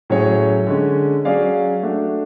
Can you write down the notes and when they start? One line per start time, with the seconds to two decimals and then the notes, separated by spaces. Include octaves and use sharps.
0.10 A2 F#3 C#4 G#4 C#5
0.67 D3 G#3 C#4
1.25 F#3 C#4 G#4 D5 F5
1.83 A3 D4 F#4